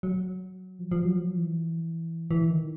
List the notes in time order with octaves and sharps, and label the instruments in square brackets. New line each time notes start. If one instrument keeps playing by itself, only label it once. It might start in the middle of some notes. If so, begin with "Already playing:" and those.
[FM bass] F#3
F3
F3
F#3
F3
E3
E3
D#3